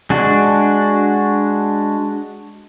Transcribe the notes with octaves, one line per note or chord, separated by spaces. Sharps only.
G#3 D4 F#4